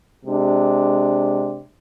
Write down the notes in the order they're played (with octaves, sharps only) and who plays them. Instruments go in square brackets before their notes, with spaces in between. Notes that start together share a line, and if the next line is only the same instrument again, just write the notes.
[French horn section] C3 G#3 D4